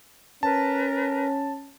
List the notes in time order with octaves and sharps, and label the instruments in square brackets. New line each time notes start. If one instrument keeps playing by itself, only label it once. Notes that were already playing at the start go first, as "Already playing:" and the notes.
[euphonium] C#4 [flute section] A#4 B4 [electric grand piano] A5